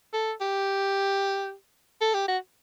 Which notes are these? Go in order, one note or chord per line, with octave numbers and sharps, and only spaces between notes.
A4
G4
A4
G4
F#4